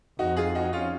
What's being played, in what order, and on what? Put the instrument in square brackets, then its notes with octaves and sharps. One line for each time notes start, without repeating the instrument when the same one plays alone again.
[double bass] F2 [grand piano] D#4 F#4
[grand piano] F4 G#4
D#4 F#4
C#4 F4